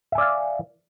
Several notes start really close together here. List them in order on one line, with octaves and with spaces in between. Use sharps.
E5 G#5 D5 F5